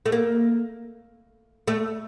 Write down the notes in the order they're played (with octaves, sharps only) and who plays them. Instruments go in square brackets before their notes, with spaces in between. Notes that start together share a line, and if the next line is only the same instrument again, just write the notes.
[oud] A3
A#3
A3